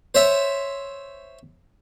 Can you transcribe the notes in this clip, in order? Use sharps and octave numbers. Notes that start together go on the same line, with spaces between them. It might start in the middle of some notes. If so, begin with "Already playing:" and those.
C5 C#5 E5